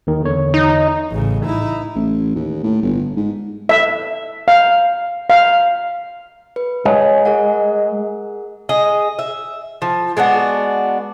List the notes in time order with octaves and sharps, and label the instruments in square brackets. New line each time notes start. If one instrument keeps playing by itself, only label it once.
[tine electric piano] D#2 D#3
E2 D3 C#5
[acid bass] D#4
[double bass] A1 C#3
D#4 E4
[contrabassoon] A1
D#2
A2
G1
G#2
[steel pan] E5
F5
F5
[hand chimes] B4
[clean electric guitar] G#3 [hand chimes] C#5
[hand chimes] G#4 A#4 F#5
[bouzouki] G#4 D#5
E5
F3
G#3 B3 D4 F#4